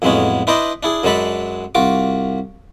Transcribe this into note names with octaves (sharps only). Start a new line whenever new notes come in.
F2 A2 F#3 G#3 B3 C#4
D4 E4 B4 C5 D5 D#5
D4 E4 G#4
F#2 F#3 G#3 D4 A4 B5
C2 F4 F#4 D6